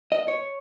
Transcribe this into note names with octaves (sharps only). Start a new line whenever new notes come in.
D#5
C#5